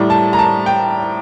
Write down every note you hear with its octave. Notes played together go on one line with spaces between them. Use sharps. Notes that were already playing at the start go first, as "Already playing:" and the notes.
Already playing: A2 G3 A#5
A5
A#5
A5
G5